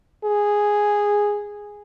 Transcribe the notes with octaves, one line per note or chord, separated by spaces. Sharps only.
G#4